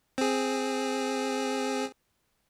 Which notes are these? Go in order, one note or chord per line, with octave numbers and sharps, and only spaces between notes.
C4 G#4